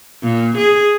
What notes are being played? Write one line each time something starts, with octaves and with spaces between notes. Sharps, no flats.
A#2
G#4